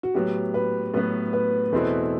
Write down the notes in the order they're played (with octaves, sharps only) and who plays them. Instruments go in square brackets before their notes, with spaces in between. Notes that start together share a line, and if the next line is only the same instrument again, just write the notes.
[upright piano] F#4
[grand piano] A2 F#3 B3 [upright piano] G4
[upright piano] B4
[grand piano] A2 F#3 B3 [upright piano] B4
[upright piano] B4
[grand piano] E2 B2 A3 C4 E4 [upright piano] B4